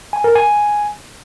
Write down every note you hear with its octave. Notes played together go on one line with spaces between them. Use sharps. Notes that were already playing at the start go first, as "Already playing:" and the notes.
G#5
A#4
G#5